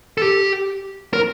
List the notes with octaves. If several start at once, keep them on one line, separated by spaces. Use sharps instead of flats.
A4
G4
A#4